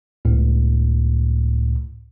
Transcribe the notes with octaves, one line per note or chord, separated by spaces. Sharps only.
C#2 A2